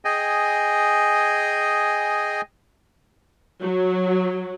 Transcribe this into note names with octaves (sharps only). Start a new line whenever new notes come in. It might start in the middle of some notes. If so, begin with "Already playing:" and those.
G#4 D#5 G5 G#5
F#3